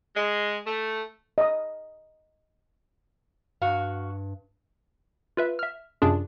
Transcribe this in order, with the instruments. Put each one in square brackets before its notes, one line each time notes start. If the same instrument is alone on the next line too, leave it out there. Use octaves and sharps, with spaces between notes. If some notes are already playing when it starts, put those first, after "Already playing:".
[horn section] G#3
A3
[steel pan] D#5 D#6
[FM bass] G2 [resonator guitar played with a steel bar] F#4 F5
[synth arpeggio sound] F4 B4 E5
E5 F6
F#2 C3 D4 F4 G#4